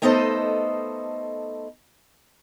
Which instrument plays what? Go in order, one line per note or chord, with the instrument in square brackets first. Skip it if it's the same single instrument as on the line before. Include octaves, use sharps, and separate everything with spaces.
[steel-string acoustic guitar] A3 B3 D#4 A4 C5 D#5